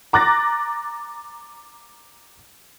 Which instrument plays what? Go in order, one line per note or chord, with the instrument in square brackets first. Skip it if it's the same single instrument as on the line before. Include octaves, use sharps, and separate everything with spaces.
[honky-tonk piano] A#5 D6 F#6 A6 A#6